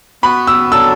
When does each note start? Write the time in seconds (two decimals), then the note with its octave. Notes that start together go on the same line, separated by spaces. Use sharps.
0.23 B3 F#4 B4 B5
0.47 E6
0.72 F#3 D4 A4 E6